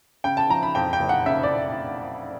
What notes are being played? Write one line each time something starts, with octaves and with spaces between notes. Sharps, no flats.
C#3 G5
A5
F3 A#5
B5
F2 G5
G5
F#1
F#5
C#3 E5
D5